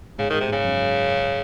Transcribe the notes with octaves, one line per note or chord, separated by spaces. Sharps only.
G#2 C#3
G#2 D#3
C3
G#2
C#3
F#2